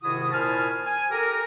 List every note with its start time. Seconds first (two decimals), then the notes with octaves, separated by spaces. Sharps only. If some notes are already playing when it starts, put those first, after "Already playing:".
0.02 G#2 C3 D#3 E4 F#4 D#6
0.32 A#2 E4 C5 G#5 A5 F6
0.85 G#5
1.10 G4 A4 A#4